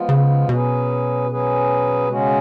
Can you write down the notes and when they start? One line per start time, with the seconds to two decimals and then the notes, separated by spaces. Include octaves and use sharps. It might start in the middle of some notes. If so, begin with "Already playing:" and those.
Already playing: F3 G#3 B3 F4
0.09 C#3
0.48 B2 F#3 C#4 G#4 B4
1.29 F#3 C#4 G#4 B4
2.08 C#3 G#3 C#4 F#4